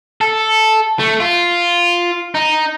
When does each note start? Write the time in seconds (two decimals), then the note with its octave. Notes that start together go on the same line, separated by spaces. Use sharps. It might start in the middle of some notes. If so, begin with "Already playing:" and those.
0.21 A4
0.99 A3
1.20 F4
2.35 D#4